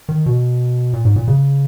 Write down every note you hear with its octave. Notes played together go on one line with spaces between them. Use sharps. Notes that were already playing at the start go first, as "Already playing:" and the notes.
D#3
B2
A#2
G#2
A#2
C#3